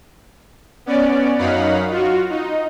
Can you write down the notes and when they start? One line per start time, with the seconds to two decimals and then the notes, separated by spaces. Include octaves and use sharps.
0.86 B3 C#4 D5
1.38 F#2 F#3 D#4 F5 F#5 B5
1.90 F4 F#4
2.30 D#4